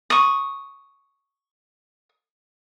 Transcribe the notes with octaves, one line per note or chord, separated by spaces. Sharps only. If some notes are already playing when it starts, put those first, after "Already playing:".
C#6 D#6